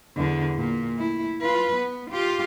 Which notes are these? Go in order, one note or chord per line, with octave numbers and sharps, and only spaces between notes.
E2 D3
A#2
A3 E4
F4 B4
B3
F4 G4